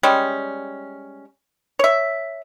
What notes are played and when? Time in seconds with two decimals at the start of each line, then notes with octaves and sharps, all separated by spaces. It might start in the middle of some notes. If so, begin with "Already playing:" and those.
0.03 G3 G#3 C#4
1.79 C#5 E5